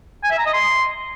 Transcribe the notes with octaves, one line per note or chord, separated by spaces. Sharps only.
G#5
E5
A#5
D#5
C6